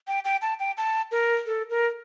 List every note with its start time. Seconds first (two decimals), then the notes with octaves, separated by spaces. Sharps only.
0.07 G5
0.25 G5
0.42 A5
0.60 G5
0.77 A5
1.12 A#4
1.46 A4
1.70 A#4